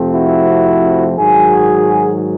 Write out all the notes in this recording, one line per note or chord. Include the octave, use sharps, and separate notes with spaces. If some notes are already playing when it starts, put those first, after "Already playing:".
Already playing: F2 C3 F3 A3 C4
E4 F#4
G#2 D#3 F#3 F#4 G#4